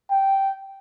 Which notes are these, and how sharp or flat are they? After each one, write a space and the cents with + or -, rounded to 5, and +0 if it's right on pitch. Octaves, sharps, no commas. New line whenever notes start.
G5 -10